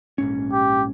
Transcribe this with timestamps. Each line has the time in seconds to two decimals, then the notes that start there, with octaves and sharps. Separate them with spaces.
0.18 A#1 G#2 C#4
0.52 G4